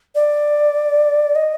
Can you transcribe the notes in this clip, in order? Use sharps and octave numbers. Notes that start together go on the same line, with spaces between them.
D5
D#5